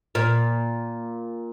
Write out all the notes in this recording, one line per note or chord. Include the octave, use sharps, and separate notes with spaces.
A#2